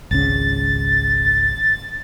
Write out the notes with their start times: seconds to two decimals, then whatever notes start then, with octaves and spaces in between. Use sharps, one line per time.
0.11 G#1 C#2 C#3 A6